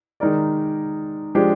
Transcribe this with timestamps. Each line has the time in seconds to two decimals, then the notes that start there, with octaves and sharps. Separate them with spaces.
0.20 D#3 G#3 D#4 A#4 D5
1.35 F3 G#3 D4 G4